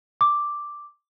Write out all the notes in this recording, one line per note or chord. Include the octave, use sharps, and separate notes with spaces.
D6